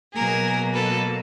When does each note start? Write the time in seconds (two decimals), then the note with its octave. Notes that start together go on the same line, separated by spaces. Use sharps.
0.13 B2 F#3 A#3 G#4 A#4
0.73 A4 B4